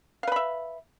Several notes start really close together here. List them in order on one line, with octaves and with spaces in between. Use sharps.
F5 B4 B5 E5